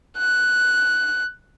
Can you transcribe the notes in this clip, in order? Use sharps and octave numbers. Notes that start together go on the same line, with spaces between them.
F#6